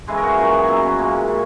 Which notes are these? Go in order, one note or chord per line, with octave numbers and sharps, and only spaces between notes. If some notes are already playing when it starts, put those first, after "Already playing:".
C#3 E3 G#3 G#4
A#4
F#4
G#4
A#2 F#3 F#4
G#4
B2 F#3 E4
C#4
A#2 G#3 A#3
C#3